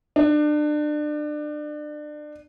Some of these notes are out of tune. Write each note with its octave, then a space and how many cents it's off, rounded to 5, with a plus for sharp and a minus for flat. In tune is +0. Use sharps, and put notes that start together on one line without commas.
D4 +30